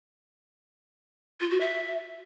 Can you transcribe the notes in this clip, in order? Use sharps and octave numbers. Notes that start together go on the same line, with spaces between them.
F4
F#4
E5